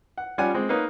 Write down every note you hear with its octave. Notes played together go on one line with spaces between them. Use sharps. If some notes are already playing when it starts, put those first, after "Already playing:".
F#5
G3 C#4 F4 F#5 G#5
G#3 C4
A#3 B3 D#4 B4 C#5